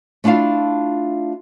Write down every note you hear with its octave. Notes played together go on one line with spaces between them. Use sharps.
A3 D4 E4 F4 F5